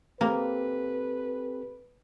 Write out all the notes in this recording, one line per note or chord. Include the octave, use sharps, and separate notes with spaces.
A#3 C4 G4 A4 B4